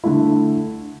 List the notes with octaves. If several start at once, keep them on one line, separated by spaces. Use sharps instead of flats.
D3 A3 E4